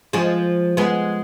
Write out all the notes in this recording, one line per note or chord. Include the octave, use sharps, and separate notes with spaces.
F3 G#3
G#3 B3